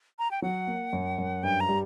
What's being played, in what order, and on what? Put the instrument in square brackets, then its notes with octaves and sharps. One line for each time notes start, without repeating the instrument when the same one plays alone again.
[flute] A#5
G5
[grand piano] F#3 [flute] F#5
[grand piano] A#3
F#2
F#2
[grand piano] G2 [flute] G5
[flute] A#5
[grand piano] G3